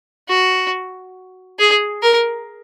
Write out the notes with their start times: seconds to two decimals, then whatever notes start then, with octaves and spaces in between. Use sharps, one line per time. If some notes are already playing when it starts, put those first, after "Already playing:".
0.29 F#4
1.59 G#4
2.03 A#4